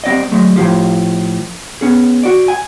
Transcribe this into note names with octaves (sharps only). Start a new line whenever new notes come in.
G3 C4 D5 D#5
F#3 G#3 A3
A2 F3 F4 G4
B3 C#4 G#4
F#4 D5
G#5